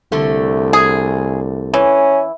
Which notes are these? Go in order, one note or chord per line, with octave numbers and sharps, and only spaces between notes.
C2 D3 A3
G#4
E3 C#4